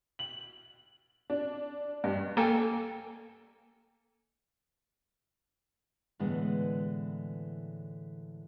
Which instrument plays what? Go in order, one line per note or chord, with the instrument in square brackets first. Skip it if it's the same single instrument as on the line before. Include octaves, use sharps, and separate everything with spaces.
[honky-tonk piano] F#7
D4
G2
[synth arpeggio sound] A#3 A4 G5 G#5
[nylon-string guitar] A2 D3 E3 G#3 B3